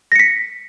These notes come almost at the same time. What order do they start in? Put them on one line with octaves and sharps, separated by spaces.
A#6 C#7 B6